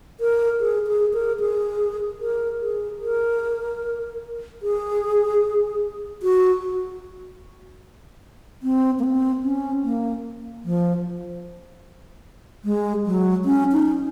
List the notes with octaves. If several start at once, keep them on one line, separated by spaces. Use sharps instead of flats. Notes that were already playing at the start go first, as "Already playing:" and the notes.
A#4
G#4
G#4
A#4
G#4
A#4
G#4
A#4
G#4
F#4
C4
A#3
C4
C#4
A#3
F3
G#3
F#3
C#4
D#4